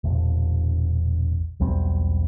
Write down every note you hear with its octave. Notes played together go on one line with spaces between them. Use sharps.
E1 A#1
B1 E2 G3 C4